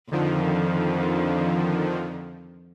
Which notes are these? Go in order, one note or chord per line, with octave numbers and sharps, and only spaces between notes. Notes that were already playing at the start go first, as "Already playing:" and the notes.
F2 D3 D#3 F3